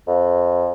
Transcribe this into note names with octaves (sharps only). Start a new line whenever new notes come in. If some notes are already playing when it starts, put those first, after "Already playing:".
F2